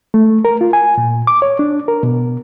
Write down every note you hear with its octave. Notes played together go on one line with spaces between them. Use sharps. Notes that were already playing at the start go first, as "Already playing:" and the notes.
A3
A#4
F4
G#5
A#2
D6
C#5
D4
A#4
B2